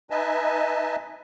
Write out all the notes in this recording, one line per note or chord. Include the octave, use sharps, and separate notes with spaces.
D#4 B4 D#5 E5 G#5 A5